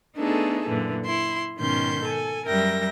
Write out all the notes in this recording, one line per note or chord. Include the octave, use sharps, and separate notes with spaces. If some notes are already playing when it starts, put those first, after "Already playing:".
A3 B3 D4 D#4 G#4 A4
F#2 A#2 D3 E3
E4 C6
G#2 B2 D#3 C#4 C6 G6
A4 G#5
F#2 G3 A#4 E5 G5 A#6